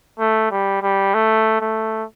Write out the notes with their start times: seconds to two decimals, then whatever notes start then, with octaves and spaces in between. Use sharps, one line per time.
0.19 A3
0.51 G3
0.83 G3
1.14 A3
1.61 A3